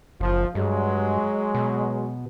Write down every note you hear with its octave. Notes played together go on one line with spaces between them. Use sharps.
F#1 F3
G2 F#3 G#3
B2